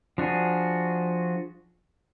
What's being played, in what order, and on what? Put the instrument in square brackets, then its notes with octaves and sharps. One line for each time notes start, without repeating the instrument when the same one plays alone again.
[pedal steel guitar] F3 D4 F#4 G#4